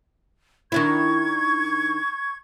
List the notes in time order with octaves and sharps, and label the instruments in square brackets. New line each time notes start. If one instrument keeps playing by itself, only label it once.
[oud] D#3 D4 E4 [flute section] C#6 G#6